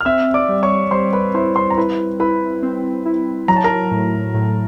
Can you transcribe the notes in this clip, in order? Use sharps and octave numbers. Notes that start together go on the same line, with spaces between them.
F6
C4 E5 E6
D5 D6
G3
C#5 C#6
G3 C5 C6
B4 B5
E4 C5 C6
C5 C6
A#5
E4 B4 B5
E4 B4 B5
C4
E4
F#3 A#5
A5
A#4 A#5
A2
A2